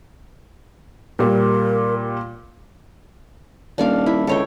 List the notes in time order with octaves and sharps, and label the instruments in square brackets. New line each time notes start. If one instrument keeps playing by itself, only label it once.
[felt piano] A#2 G3 [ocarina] A#4
[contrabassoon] D#1 [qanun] D4 D5 F5
[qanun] E4
[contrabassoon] C#2 [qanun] A4 C#5 G5